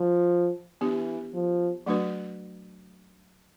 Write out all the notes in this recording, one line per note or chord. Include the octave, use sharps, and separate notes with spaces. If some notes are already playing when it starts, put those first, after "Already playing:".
Already playing: F3
E3 B3 D4 G4
F3
F#3 A3 D4 F#4 B4